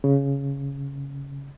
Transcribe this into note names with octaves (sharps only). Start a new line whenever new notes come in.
C#3